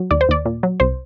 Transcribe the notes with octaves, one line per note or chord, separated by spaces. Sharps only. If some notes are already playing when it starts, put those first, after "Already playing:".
Already playing: F#3
D#2 D5
C5
D#2 D5
A#2
F#3
C2 C5